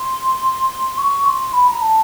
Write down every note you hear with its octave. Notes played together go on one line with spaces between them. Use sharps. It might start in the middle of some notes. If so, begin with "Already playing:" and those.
Already playing: C6
C#6
C6
B5
A#5
A5